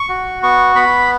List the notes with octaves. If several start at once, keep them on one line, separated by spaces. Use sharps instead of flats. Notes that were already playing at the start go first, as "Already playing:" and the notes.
Already playing: C#6
F#4
B3 C#6
B3 B5